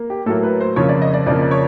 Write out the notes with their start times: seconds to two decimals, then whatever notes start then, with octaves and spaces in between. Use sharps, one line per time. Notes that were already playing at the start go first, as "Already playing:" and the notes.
Already playing: A#3
0.10 G4
0.26 A2 F#3 A#3 A4
0.43 B4
0.60 C5
0.76 F2 C#3 F3 A#3 C#5
0.89 D5
1.02 D#5
1.14 D5
1.26 F2 C#3 F3 A#3 D5
1.42 D5
1.51 C#5